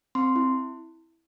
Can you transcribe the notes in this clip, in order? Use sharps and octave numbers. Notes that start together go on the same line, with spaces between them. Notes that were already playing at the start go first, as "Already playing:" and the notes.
C4 C6
E4